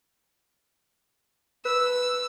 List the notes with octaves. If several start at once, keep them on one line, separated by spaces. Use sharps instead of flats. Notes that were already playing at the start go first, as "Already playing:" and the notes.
B4 E6